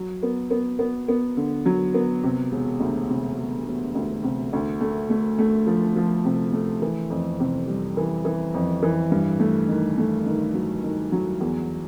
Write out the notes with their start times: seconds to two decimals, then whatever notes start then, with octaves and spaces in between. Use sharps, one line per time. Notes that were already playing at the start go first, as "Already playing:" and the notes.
Already playing: F#3
0.23 B3
0.51 B3
0.79 B3
1.08 B3
1.37 D3
1.66 F#3
1.94 B3
2.24 C3
2.52 E1
2.80 D2
3.10 C3
3.38 E1
3.66 E1
3.95 D2
4.24 C3
4.53 D2
4.81 A3
5.10 A3
5.39 A3
5.67 F3
5.96 F3
6.25 C3
6.53 A3
6.82 E3
7.10 F2
7.40 C3
7.67 G3
7.97 E3
8.25 E3
8.54 F2
8.82 E3
9.11 G2
9.40 A3
9.68 D#3
9.98 A3
10.26 D#3
10.54 F#3
10.83 D#3
11.12 F#3
11.40 E2